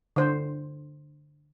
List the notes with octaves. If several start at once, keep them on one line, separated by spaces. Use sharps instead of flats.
D3 C5